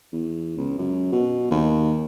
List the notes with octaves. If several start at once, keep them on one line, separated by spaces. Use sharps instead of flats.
E2
C#2
F#2
B2
D#2